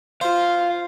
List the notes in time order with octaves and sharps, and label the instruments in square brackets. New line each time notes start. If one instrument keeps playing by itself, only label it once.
[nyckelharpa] F4 [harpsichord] C5 [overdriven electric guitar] F5